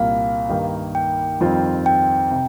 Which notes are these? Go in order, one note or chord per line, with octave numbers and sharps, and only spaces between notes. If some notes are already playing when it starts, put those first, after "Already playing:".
Already playing: C2 A#2 G3 A#3 F5
G2 D#3 A#3 D#4 G4
G5
F2 D#3 G3 C4 F4
G5
C3